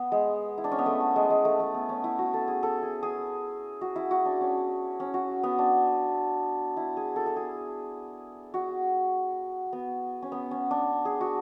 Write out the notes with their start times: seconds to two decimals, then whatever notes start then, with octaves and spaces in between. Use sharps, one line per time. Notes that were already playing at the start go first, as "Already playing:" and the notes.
Already playing: B3
0.12 G#3
0.58 E4
0.64 D4
0.72 C#4
0.79 B3
0.86 A3
1.00 A3
1.16 G#3
1.30 G#3
1.45 A3
1.60 A3
1.74 B3
1.89 C#4
2.04 E4
2.19 F#4
2.34 A4
2.48 G#4
2.63 A4
2.83 G#4
3.03 G#4
3.81 F#4
3.96 E4
4.11 F#4
4.25 D4
4.41 C#4
5.00 C#4
5.14 F#4
5.43 B3
5.59 D4
6.77 E4
6.97 G#4
7.16 A4
7.26 A4
7.36 G#4
8.54 F#4
9.73 B3
10.22 C#4
10.32 B3
10.51 C#4
10.71 D4
11.05 G#4
11.21 F#4